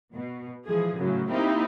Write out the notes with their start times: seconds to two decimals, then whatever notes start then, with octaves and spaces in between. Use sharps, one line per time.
0.13 B2
0.66 E3 F3 G#3 G#4
0.97 F#2 A2 C#3 F#3
1.30 A#3 C4 D#4 E4 G4